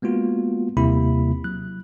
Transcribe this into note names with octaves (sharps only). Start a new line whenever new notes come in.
G#3 A#3 B3 F4 F#4
D#2 C3 G3 A#3 E4 B5
F#3 F#6